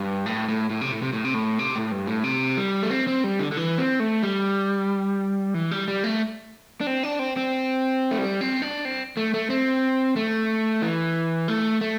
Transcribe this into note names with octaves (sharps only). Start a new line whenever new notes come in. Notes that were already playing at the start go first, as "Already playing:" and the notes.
Already playing: G2
A2
A2
A2
C3
A2
C3
A2
C3
A2
C3
A2
G2
A2
C3
G3
A3
C4
C4
G3
D3
D3
E3
C4
A3
G3
E3
G3
G3
A3
D4
C4
D4
C4
C4
A3
G3
C4
D4
C4
A3
A3
C4
A3
E3
A3
A3